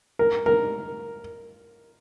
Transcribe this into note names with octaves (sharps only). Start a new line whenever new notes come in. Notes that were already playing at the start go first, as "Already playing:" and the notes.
A#4
A#4